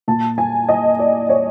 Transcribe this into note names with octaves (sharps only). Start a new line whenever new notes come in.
A#2 A5
G#5
D#5
D5
C#5